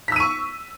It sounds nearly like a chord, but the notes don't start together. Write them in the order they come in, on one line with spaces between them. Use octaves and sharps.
B6 E6 D#7 C#6